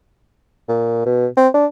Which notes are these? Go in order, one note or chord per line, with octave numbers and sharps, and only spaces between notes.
A#2
B2
C4
D4